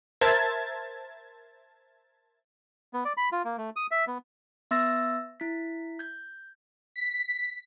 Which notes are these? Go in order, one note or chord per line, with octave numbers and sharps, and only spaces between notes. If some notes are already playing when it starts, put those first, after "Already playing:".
A#4 C5 E5 A5 G#6 A6
B3
D5
B5
F4
A#3
A3
D#6
E5
B3
B3 E5 C6 E6 A6 A#6
E4 B6
G6 G#6
B6